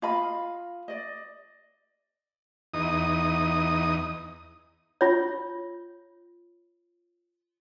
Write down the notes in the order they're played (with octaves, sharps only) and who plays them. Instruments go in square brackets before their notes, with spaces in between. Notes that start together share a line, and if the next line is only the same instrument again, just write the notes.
[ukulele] F4 D#5 F5 B5
D5 D#5
[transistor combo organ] E2 D#4 D#6
[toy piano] F4 C#5